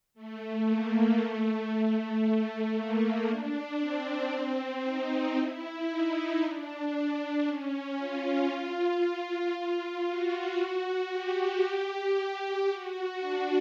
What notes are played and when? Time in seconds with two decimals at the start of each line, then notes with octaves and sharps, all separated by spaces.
0.14 A3
0.67 A#3
1.19 A3
1.71 A3
2.23 A3
2.75 A#3
3.28 D4
3.79 C4
4.31 C4
4.84 D#4
5.36 E4
5.88 D#4
6.41 D4
6.93 D4
7.44 C#4
7.97 F4
9.54 F4
10.06 F#4
10.58 F#4
11.10 G4
11.62 G4
12.67 F#4
13.19 D4